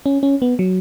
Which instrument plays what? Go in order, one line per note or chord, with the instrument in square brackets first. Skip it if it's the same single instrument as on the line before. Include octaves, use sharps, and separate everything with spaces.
[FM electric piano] C#4
C#4
B3
F#3